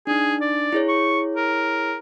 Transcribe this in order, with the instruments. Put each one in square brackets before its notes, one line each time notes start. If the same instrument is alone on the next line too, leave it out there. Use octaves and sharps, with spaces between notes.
[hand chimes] D4 D#4 [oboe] G#4
[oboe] D5
[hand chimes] E4 G#4 C#5
[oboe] C#6
A#4